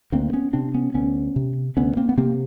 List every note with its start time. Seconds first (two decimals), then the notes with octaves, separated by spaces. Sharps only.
0.12 D2 A#3 C4
0.33 B3 C#4
0.53 C3 C4 D4
0.74 B3 C#4
0.94 D2 B3 C#4
1.36 C3
1.77 D2 B3 C#4
1.97 A#3 C4
2.09 B3
2.17 C3 A#3 C4